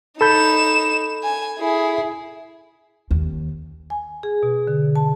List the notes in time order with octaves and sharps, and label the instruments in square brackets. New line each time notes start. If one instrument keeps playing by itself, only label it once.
[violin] D#4 E7 [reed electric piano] A4 B5 G6
[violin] G#5
E4 G#4
[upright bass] D#2
[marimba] G#5
G#4
B2
D3
A5